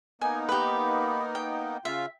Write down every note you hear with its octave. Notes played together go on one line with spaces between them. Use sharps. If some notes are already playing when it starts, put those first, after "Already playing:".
A#3 B3 D#4 G#5
G4 B4
G5
C#3 F4 E5 F5